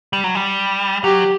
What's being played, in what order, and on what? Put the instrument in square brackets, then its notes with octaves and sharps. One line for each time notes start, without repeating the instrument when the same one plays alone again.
[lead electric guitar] G3
F#3
G3
[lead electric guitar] F#3 [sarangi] G4